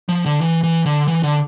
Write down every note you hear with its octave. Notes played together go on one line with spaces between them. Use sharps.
F3
D3
E3
E3
D3
E3
D3